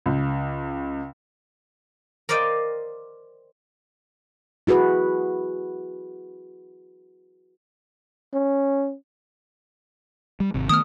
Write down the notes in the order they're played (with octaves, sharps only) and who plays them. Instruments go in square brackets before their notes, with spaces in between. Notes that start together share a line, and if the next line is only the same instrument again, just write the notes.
[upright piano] C#2
[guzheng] A#4 C5 D5 D#5 F5 G5
[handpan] E4 F#4 G#4 B4
[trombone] C#4
[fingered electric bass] G3
G#1 C3
[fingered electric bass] D#3 A3 B3 [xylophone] D#6 F6